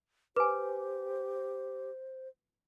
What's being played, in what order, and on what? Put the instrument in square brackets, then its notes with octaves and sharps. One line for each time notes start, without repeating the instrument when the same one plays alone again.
[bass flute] G4 [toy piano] B4 G#5 [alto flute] C5 [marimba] D6